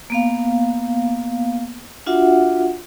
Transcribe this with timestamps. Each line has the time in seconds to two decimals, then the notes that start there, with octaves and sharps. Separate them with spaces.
0.10 A#3 B3 F5
2.06 D4 F4 F#4 E5 F#5